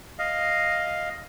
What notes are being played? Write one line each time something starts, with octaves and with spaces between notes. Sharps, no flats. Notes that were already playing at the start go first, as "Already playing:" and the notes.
D#5 F5